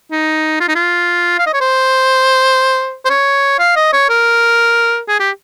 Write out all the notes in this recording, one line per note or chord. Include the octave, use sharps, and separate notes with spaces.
D#4
F4
D#4
F4
F5
D#5
C#5
C5
C5
C#5
F5
D#5
C#5
A#4
G#4
G4